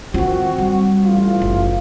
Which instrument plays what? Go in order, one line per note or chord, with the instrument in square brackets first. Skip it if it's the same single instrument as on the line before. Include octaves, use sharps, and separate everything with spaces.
[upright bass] D#3 F4 [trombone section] C4 F#4
[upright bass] G3
[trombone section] A1 F4
[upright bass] F#1